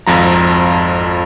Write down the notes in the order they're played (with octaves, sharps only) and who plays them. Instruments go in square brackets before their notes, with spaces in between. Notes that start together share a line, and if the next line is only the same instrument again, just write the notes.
[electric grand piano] G#1 F2 F3 A#5